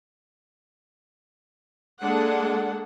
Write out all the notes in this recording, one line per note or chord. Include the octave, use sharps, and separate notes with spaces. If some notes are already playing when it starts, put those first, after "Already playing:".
G#3 A#3 D4 A4 F#5